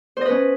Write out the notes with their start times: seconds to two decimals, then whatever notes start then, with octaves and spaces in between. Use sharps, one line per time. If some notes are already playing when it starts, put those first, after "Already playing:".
0.17 C5
0.21 D#5
0.26 B4
0.30 C#4